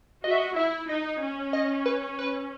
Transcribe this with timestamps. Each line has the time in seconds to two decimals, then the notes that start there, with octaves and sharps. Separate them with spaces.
0.24 F#4 D#5
0.31 E5
0.38 D#5
0.56 E4 E5
0.89 D#4 D#5
1.22 C#4
1.53 D#5
1.86 B4
2.19 B4